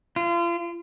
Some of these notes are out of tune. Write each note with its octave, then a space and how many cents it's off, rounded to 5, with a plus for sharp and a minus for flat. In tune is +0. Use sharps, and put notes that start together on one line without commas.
F4 -35